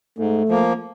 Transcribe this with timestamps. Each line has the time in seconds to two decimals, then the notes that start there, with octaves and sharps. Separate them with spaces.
0.18 G#2 A3
0.49 F3 A#3